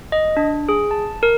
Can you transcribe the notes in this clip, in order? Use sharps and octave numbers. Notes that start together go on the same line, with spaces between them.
D#5
D4
G#4
A5
A#4